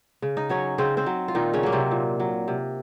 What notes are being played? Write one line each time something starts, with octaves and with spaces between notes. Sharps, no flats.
C#3
D#4 D#5
F#3 C#4 C#5
C#3 C4 C5
C4 C5
F#3
F4
A#2 D#3 D#4
C#3 C#4
F#3 A#3
C3 C4
A#2
F#3
C3